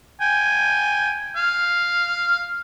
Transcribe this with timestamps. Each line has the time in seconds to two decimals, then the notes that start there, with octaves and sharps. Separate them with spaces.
0.21 G5 G#5
1.37 F5